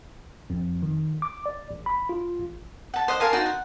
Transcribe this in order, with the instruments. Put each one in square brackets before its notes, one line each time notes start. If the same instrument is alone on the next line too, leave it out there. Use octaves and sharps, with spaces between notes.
[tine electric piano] F2
D#3
D6
D5
A1
B5
F4
A1
[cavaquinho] F#5 A5
C5 D#5 F#5
A#4 F5 G#5 A5
D#4 F#4 C5 A5
F#5